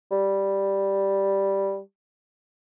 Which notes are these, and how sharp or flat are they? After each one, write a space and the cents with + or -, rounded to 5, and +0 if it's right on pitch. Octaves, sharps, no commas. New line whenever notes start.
G3 +0